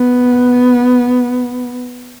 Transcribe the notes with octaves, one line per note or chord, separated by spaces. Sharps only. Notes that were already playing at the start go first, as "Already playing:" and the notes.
Already playing: B3